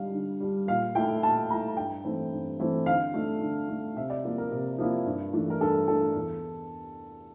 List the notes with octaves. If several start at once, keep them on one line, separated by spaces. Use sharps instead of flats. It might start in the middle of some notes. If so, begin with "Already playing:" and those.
Already playing: D3 G3 D4 F5
D3
G3 D4
A#2 F5
A3 E4 G5
A#2 A5
A3 E4 A#5
G2 G5
E3 A3 C4 E4
G2
E3 A3 C4 E4
D3 F5
A3 D4
D3
A3 D4
C3 E5
D5
F3 A#3 E4
A#4
C3
F3 A#3 E4
G2
E3 A3 D4
A#4
G2 A4
E3 A3 D4 A4
E2